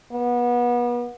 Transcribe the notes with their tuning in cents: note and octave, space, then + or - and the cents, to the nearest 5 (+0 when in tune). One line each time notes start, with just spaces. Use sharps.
B3 -30